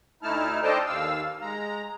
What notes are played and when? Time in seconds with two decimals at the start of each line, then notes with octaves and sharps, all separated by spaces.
0.23 D2 A3 D#4 E4 A5 F6
0.63 D4 A4 C5 D#5 G5 A5
0.86 D#2 F5 E6
1.42 G#3 A#5